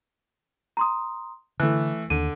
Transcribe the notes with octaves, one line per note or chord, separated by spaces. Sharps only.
A#5 C6 D#6
D3 E3 A3 F#6
D#2 D3 D#7